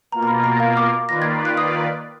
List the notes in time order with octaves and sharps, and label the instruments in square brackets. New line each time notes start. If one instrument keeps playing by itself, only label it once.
[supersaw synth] B2 A#3 F4 A#4 [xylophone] A#5
[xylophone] A#5
B5
A#5
F5
D6
[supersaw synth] D#3 A#3 F4 B4 D5 [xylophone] A#6
[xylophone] G#6
F#6
D#6